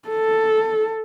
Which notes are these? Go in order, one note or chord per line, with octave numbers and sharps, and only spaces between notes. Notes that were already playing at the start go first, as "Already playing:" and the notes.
A4